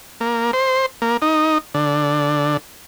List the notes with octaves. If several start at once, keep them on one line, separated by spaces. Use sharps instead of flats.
A#3
C5
A#3
D#4
D3